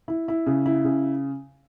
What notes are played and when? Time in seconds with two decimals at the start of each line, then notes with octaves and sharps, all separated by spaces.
0.08 E4
0.28 E4
0.46 C#3
0.66 E4
0.85 C#3